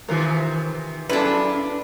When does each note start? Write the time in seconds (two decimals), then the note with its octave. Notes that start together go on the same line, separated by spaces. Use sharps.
0.08 C3 D#3 E3 F4 A#4
1.09 F#2 D4 E4 G#4 A4 B4